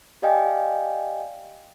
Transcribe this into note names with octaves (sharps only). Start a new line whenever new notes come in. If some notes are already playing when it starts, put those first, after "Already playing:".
G4 D5 D#5 F5 G5 G#5